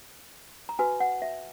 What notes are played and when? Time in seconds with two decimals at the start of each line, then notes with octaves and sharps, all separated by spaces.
0.69 A#5
0.79 F#4 B4 G#5
1.00 F#5
1.22 E5